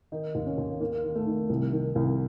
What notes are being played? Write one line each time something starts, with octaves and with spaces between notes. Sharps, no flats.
D#3 D#4
D#2
C#4
D#2
D#3 A#3
D#3
A3
D#3
C2
D#3
C2